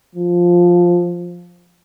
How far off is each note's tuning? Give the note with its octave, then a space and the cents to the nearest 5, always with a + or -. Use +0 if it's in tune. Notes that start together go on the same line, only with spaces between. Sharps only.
F3 +5